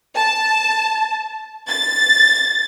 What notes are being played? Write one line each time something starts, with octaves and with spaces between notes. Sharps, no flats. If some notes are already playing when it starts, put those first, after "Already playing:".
A5
A6